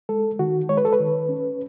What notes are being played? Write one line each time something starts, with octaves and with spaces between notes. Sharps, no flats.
G#3 A4
D#3 F#4
G#3 C#5
B4
A4
B4
D#3
C#4